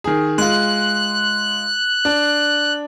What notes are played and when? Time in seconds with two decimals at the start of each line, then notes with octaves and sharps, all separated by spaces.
0.04 D#3 G#4
0.38 G#3 F4 F#6
2.05 D4